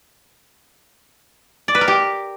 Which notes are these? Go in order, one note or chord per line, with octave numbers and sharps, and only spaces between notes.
D5
B4
A#4
G4